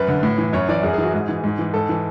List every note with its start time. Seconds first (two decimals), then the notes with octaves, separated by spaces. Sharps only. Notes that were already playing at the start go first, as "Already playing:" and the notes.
Already playing: F#2 B4
0.08 D3
0.23 A2
0.38 E3
0.53 F#2 C#5
0.69 E3 D5
0.83 F#2 G#4
0.93 E3 G#4
1.03 F#4
1.14 G#2 G#4
1.29 E3
1.44 G#2
1.59 E3
1.74 G#2 A4
1.89 E3